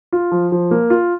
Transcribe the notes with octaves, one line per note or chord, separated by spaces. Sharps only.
F4
F3
F3
A#3
F4